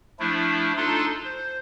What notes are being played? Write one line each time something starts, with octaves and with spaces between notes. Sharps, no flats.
F3 A3 D4 E4
D4 D#4 F4 A4 C6
C5